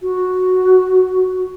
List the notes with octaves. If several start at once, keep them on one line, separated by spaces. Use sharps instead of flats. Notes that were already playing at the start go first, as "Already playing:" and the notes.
F#4